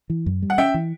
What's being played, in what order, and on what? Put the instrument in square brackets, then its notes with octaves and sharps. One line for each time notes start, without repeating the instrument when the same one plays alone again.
[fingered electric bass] E3
F#2
G3
[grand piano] F#5
[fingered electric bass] C#4 [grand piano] E5 G5
[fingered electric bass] E3